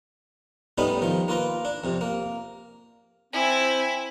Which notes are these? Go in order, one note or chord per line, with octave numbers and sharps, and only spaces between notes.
A2 G3 B3 C#4 D#4 B5
D#3 F3
A#3 F4 B4 A#5
D4
F2 C3
A#3
C4 E4 G#5